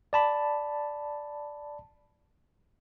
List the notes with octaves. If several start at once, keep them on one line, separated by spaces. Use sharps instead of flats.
D5 A5 B5